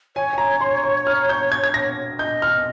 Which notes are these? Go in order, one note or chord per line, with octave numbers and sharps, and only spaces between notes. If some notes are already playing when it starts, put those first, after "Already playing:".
C#5 G#5
G#5
A#5
C6
C#6
F6
G6
G#6
G#6
A#6
D#5 G6
F6